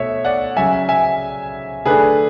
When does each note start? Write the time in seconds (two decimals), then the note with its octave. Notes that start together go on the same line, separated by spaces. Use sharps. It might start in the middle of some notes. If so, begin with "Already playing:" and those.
Already playing: B2 A3 C#5 E5
0.25 D5 F#5
0.57 C#3 F#3 C#4 E5 G#5
0.89 E5 G#5
1.85 D3 A3 D4 G#4 B4